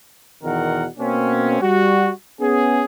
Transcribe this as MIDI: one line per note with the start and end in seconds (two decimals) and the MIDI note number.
0.43 0.86 40
0.43 0.86 47
0.43 0.86 51
0.43 0.86 70
0.43 0.86 78
0.97 1.59 47
0.97 1.59 58
0.97 1.59 60
0.97 1.59 61
1.61 2.10 55
1.61 2.10 66
2.40 2.85 59
2.40 2.85 61
2.40 2.85 68